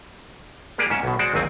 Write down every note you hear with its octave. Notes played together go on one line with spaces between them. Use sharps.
A#3 G4 G#4 D5
G#2 C#4 E5
B1 B2
G#3 F#4 C5 D5
G#1 D#2 F#3 C4 G#5